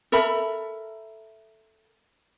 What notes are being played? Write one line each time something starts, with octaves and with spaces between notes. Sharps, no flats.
A4 A#4 E5 B5